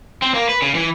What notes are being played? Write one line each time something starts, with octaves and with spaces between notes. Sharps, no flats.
C4
A#3
B4
C#3
E3